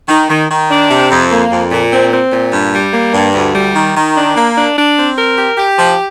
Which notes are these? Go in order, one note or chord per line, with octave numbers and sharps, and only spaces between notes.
D#3
D#3
D#3
D4
C3
F2
A#3
F2
A#2
C4
C4
A#2
G2
G3
A#3
G2
D2
G3
D#3
D#3
D4
A#3
D4
D4
C4
A#4
G4
G4
F3